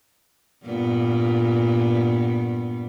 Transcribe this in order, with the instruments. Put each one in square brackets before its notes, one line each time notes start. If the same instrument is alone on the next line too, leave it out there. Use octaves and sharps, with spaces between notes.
[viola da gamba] G2 A#2 B3